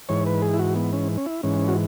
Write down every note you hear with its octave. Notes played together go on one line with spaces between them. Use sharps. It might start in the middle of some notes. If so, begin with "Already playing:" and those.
G#2 E3 C#5
B4
G#4
E4
F#4
B3
C#4
C#4
E4
G#2 E3 C#4
F#4